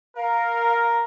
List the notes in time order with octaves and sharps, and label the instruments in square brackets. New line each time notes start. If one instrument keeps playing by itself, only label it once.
[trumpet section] A#4 [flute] F5